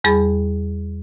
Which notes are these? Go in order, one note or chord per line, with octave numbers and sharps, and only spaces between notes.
E2 G3 G#4 B5 A6